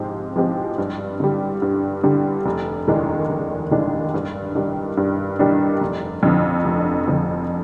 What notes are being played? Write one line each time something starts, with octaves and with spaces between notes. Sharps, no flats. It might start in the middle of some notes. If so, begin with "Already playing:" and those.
Already playing: G#2 F3 G#3 C4 G4
F3 G#3 C4 G4
G2
D3 G3
G2
D3 G3
F1
D#2 D#3 G#3 D4
F1
D#2 D#3 G#3 D4
G2
D#3 G3 D4
G2
D#3 G3 D4
F1
F2 D3 F3
F1
F2 D3 F3